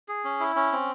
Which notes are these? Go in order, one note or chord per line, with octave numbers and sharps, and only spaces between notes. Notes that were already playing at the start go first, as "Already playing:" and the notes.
G#4
C#4
E4
C#4
C4